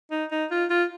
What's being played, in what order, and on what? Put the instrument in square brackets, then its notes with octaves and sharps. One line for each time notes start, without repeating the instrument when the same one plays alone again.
[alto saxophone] D#4
D#4
F4
F4